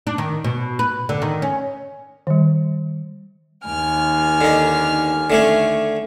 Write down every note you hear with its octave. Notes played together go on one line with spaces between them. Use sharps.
D4
D#3
B2
B4
D3
D#3
C#4
D#3 G3
D#2 G#5 F6
D3 D#4
D3 A3 C#4